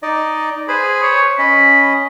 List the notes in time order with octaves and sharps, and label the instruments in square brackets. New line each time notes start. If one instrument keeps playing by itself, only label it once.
[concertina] D#4 D5 D#5
[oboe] G#4 [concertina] B4 C5 B5
[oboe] C#5
[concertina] C#4 D#5 [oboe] B5